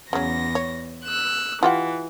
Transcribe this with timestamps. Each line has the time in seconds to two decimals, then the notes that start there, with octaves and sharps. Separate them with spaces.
0.13 E2 C#3 F#3 A#6
0.55 C#5
1.06 E6 F#6
1.63 E3 F4 G4 F#5